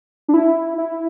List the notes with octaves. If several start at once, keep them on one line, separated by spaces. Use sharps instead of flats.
D4
E4
E4